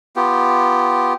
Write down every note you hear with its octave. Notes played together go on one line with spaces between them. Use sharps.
B3 F4 G4